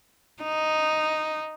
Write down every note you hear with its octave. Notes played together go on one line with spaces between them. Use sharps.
D#4